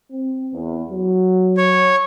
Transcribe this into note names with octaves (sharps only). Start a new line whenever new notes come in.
C4
E2
F#3
C#5